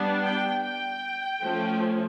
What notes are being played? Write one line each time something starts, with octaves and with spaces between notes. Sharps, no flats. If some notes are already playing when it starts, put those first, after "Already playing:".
Already playing: G3 B3 D4
G5
G5
F3 A3 C#4